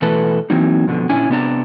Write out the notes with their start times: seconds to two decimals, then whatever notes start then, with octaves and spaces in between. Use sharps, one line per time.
0.02 B2 E3 A3 A4 B4
0.50 E3 F#3 A#3 C4 D#4
0.87 F2 B2 D3
1.09 A#2 C#4 D4 E4 G#5
1.29 C3 B3 D4 A#5